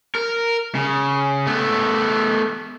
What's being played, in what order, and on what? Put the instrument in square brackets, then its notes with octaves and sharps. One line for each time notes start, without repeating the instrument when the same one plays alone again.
[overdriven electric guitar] A#4
C#3
A3 B3